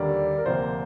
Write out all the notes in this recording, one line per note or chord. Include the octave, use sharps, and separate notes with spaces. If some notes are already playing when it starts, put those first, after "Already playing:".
Already playing: D#2 D3 G3 A#3 D5
A#4
D2 C3 F3 A#3 C5